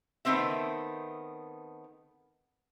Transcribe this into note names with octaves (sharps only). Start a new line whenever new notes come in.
D#3 A3 B3 C4 E5